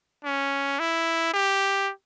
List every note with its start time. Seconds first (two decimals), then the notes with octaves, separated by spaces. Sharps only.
0.24 C#4
0.79 E4
1.34 G4